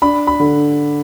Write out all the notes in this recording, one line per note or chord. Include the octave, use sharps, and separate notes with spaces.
D4 B5
B5
D3